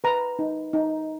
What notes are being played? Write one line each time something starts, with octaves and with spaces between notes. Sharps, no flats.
B4 A#5
D#4
D#4